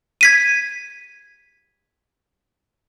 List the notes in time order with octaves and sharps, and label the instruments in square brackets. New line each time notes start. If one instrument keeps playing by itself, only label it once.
[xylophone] G#6 B6 D#7